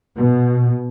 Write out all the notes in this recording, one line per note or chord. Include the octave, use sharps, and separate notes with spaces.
B2